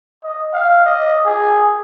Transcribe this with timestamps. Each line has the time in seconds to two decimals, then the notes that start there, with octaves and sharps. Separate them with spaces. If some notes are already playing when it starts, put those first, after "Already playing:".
0.23 D#5
0.53 F5
0.85 D#5
1.25 G#4